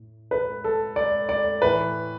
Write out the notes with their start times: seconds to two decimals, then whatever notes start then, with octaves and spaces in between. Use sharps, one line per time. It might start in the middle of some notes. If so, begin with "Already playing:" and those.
Already playing: A2
0.31 B4
0.64 A4
0.96 D5
1.29 D5
1.62 A2 E3 B4